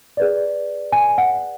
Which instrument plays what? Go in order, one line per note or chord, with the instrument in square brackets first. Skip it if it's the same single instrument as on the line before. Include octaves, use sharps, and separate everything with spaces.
[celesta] G#4 B4 D5
G#5
F#5